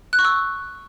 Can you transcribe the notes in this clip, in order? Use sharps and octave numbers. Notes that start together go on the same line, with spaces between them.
F#6
C#6
E6